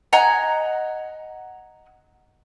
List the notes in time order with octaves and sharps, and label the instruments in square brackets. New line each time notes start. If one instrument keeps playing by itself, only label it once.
[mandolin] D#5 F#5 G#5 A#5